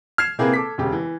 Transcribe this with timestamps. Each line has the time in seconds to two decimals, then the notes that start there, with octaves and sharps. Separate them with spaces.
0.18 F6 G#6 C7 E7
0.39 C3 A#3 C4 E4 G#4 B4
0.53 A4 D6 B6
0.78 E1 C#3 G4
0.92 E3